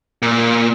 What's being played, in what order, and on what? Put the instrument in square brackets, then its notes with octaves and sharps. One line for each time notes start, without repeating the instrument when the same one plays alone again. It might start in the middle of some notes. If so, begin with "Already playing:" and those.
[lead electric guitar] A#2